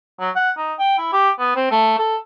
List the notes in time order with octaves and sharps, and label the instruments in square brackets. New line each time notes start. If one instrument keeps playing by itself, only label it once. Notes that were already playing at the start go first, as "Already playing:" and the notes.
[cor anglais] F#3
F#5
D#4
G5
E4
G4
B3
C4
A3
A4